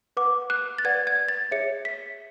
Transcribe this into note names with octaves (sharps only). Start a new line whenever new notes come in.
B4 F#5 D6
F#6
A6
B4 D5 F#5 G#6
G#6
A6
G#4 C#5 E5 C#7
B6